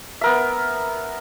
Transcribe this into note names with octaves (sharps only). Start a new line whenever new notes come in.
B3 A#4 E5